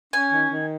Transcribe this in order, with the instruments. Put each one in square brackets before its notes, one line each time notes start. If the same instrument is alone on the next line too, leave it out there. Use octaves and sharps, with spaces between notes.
[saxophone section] C#4 [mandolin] G#5
[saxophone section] D#3
D#3